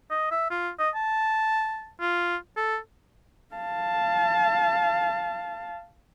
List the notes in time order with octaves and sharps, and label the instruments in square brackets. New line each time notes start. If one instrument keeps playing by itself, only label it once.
[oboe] D#5
E5
F4
D#5
A5
F4
A4
[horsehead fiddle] F5 A5